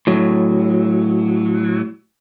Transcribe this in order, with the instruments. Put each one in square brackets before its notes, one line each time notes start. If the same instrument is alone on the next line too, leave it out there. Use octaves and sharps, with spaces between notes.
[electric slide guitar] A2 F#3